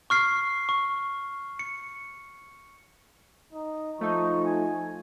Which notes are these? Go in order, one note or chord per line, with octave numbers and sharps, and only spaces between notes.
C#6 F6 C7
C#6
C#7
D#4
F3 A3 D#4 C#6
G#5